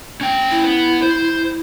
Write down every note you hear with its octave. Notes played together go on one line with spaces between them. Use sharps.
C#4 G5
E4
B3
C5